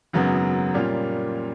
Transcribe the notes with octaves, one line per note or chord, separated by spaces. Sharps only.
G#1 F#2 C#3 F#3 B3
A#2 G3 A#3 C#4 F4